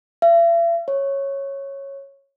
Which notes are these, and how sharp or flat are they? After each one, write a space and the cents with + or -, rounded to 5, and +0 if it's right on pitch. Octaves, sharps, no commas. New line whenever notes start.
E5 +45
C#5 -10